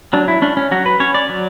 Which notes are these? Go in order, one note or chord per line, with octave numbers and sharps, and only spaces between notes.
F#3 D4
E4
C#4 D4
C#4
F#3 F#4
B4
C#4 C#5
D5
F#3